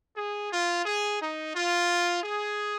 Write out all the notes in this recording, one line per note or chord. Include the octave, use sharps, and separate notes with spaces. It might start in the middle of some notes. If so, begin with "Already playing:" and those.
G#4
F4
G#4
D#4
F4
G#4